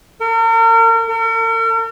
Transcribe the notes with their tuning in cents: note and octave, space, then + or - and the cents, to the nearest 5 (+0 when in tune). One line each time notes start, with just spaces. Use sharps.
A#4 -40
A#4 -45